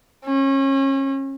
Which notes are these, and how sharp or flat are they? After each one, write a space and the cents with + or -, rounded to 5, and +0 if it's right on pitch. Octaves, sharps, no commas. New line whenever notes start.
C#4 -30